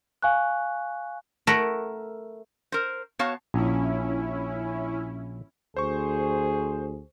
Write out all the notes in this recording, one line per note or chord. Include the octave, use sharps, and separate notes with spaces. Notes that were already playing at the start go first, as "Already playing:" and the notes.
F5 G#5 C#6 F#6
A3 E4 A#4 F#5
A#4 C5
B3 F#4 C#5 F5 A5
A#1 C#4 E4
D2 G#4 C5 C#6